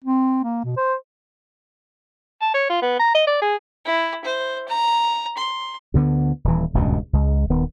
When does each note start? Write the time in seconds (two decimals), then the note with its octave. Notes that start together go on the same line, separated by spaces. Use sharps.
0.05 C4
0.44 A#3
0.64 B2
0.77 C5
2.41 A5
2.54 C#5
2.70 F4
2.82 B3
2.99 A#5
3.15 D#5
3.27 D5
3.42 G#4
3.85 E4
4.24 C5
4.69 A#5
5.37 C6
5.94 D2 D3 B3
6.44 D#1 E3
6.74 D#1 C#2 G2 B2
7.13 C#2 G#3
7.50 D#1 D#3 B3